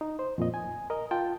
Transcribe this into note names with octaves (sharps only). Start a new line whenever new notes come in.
D#4
C5
F2 A#2 D#5
G#5
A#4 D#5
F4 G5 A5